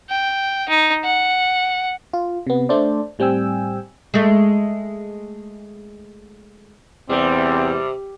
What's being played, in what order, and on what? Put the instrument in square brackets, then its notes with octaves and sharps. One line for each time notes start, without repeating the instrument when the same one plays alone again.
[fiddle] G5
D#4
F#5
[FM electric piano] F4
C3 B3
A3 D4 A4 C5 D5
A2 G3 C4 G5 G#5 E6
[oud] G#3 A3
[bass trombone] E2 [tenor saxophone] C3 [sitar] G3 [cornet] C4